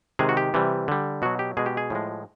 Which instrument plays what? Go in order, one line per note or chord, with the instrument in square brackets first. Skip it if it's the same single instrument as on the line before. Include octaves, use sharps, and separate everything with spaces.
[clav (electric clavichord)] C3 D#3 G#3 G#4
F#4
G4
C3 E3 G3
D3 G3
B2 F#3 F#4
G4
B2 G#3 G#4
G4
G#4
A2 F3 G#3